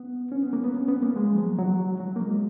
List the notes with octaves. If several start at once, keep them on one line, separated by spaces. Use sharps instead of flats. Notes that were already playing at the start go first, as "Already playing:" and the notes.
Already playing: B3
C#4
B3
A#3
B3
C#4
B3
A#3
G#3
F3
F#3
F#3
F#3
A#3
G#3